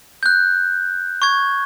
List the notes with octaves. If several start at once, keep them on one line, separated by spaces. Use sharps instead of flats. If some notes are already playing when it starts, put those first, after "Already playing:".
F#6 G6
C#6 G#6